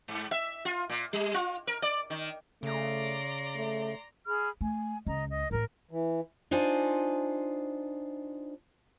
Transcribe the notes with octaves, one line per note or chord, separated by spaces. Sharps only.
G#2
E5
F4
A#2
G3
F4
A#4
D5
D#3
C#3 A3 D5 A#5 C6
A3
G#4 B5 F6
A3 G#5
C#2 D#5 A#5
D#5
A2 F#3 A#4
E3
D4 D#4 F4 C5 G#5